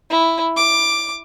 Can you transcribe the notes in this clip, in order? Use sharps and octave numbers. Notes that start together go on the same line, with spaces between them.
E4
D6